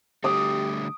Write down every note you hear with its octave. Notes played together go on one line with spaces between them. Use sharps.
D3 G3 A3 G4 D6 D#6